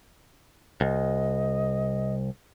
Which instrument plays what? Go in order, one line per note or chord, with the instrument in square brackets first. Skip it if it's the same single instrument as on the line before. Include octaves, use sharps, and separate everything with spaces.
[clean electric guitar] C2 [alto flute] D#5